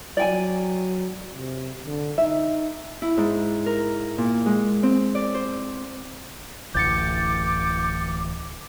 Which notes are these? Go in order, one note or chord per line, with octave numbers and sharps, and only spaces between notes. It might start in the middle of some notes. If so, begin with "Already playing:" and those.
F#3 D5 G5 G#5
C3
D3
D#4 E5
E4
G#2
A#4
A#2
G#3
C4
D5
C5
D1 A1 D2 D6 G6 A6 C#7